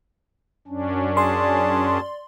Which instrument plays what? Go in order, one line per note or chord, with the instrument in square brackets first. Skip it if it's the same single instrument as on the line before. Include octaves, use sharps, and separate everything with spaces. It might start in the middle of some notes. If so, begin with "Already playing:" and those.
[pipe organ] F#2 C#4 D4
[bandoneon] G#4 A5 [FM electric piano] D5 C6